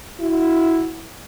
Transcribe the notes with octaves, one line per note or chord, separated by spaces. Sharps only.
E4 F#4